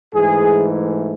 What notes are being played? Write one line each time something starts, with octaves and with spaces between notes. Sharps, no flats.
G#2 E3 A3 G#4